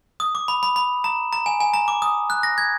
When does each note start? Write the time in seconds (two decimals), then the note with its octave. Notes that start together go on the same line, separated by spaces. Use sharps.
0.20 D#6
0.35 D6
0.48 B5
0.63 B5
0.76 B5
1.04 A#5
1.33 A#5
1.46 G#5
1.61 G#5
1.74 A#5
1.88 D6
2.02 D#6
2.30 F#6
2.43 A#6
2.58 G#6